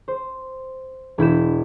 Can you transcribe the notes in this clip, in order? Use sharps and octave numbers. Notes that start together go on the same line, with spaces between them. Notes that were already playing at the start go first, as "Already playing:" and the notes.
C5
E1 E4 G6 E7